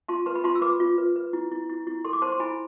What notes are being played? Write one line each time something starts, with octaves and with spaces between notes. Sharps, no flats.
F4 A5 C6
B4 A5 C6
B5
F4 A5 C6
E6
B4 B5 D6
F4
B4
B4
E4
E4
E4
E4
A4 C6
D6
C5 A5 C6
C6
E4 G#5 B5